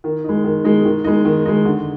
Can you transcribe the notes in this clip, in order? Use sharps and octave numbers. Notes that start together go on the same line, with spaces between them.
D#3
G#3 D#4
D#3
G#3 D#4
D#3
G#3 D#4
D#3
G#3 D#4
D3